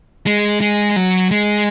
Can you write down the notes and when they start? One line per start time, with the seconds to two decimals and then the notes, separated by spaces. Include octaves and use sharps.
0.26 G#3
0.61 G#3
0.96 F#3
1.31 G#3